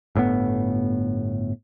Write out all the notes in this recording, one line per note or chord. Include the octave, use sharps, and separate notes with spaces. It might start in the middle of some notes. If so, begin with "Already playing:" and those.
G1 A2 D3 B3